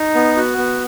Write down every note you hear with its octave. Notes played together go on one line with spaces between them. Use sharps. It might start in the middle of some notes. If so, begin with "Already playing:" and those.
Already playing: D#4
B3
F#4
B3